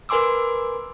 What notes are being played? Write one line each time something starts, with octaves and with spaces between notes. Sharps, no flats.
A#4 B4 G#5 C6 D6 E6